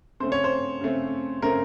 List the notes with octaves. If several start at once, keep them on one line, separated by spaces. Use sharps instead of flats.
C#3 A3 C4 C5
C#5
C5
C#3 A3 C4
C#3 A3 C4 A#4